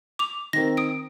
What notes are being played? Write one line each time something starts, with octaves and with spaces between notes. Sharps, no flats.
D6 F7
D#3 C4 A#4 A#6
D#6 D7